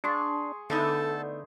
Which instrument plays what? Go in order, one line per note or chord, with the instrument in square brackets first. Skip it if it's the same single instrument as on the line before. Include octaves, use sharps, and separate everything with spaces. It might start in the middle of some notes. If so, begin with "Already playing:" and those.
[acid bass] D4 [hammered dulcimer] G#4 C6 C#6
[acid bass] D3 [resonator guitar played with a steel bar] A3 B3 D#4 [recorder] A4